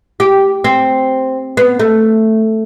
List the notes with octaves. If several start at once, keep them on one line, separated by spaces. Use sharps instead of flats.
G4
C4
B3
A3